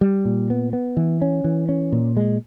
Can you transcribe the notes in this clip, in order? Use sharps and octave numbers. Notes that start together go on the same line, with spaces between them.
G3
A#2
B3
B3
E3
C#4
E3
C#4
A#2
G#3